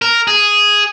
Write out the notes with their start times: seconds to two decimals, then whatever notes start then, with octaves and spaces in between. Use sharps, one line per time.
0.02 A#4
0.28 G#4